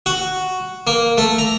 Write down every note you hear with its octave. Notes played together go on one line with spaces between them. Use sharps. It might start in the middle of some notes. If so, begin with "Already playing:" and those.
F#4
A#3
A3
A#5